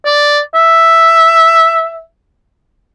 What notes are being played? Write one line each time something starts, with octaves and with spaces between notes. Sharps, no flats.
D5
E5